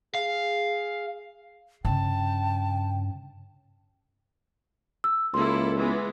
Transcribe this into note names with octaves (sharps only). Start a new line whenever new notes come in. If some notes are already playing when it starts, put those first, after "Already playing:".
G#4 F5
G2 C#3 G5 A5
E6
C#2 A#3 E4 A4 C6
E3 G#3 B3